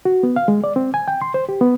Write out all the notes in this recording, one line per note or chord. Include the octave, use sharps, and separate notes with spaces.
F#4
B3
F5
G#3
D5
C4
G#5
G5
C6
C5
G4
B3